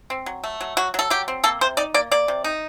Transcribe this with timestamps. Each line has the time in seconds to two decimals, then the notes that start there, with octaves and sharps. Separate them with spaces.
0.10 C4
0.26 F#3
0.44 A3
0.61 F#3
0.77 F#3 F#4
0.94 F#3 A4
1.10 F#3 G4
1.28 C4
1.44 A#3 A4
1.61 C3 C5
1.77 D#4 D5
1.94 A#3 D5
2.11 A#3 D5
2.28 C3
2.44 D#4